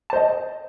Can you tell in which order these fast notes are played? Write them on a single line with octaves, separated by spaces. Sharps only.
A5 C5 D#5